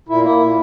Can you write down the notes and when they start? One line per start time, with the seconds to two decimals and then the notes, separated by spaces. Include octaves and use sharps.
0.09 A#2 E4
0.24 A#3 E4
0.40 A#2